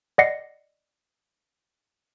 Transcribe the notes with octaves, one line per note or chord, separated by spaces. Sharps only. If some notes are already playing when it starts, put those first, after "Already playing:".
D5 D#5 F#5 A#6 C7 C#7